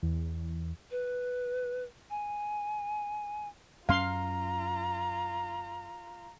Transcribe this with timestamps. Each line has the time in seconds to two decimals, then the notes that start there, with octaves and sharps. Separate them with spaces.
0.03 E2
0.91 B4
2.10 G#5
3.89 F#2 C#4 F4 F5 A#5 C6